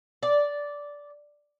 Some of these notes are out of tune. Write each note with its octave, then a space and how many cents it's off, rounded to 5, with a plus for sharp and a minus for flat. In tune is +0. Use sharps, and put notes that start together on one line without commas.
D5 -10